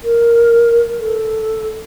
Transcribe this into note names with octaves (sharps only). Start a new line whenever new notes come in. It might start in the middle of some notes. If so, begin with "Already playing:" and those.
A#4
A4